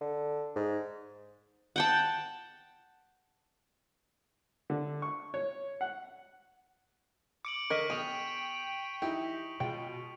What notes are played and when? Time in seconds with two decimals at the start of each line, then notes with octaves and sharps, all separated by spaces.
0.01 D3
0.56 G#2
1.76 F#5 G5 A5
4.70 D3
5.02 C#6
5.34 C#5
5.81 F#5
7.45 D6 C#7 D7 F#7
7.70 D3 A#4 D#5 C#6 B6 D#7
7.90 B2 G#4 G5 D#7 F7
9.02 E3 D#4 E4 G4
9.60 B2 G#3 F4 G5